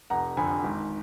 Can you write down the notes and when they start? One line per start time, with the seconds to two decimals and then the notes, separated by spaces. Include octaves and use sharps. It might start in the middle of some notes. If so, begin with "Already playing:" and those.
0.10 F1 F#5 A#5
0.37 F2 D3 G#5 B5
0.64 G#1